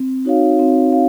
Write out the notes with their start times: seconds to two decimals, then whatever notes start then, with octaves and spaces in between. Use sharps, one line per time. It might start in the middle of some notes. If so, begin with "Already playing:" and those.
Already playing: C4
0.25 D#4 F#4 C#5 F5
0.59 C4
0.93 F5